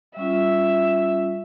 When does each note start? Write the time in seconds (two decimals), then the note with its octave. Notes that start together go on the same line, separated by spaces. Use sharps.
0.16 G3 C#4 F4 E5